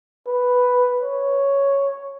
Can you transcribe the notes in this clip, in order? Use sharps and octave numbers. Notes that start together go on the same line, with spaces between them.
B4
C#5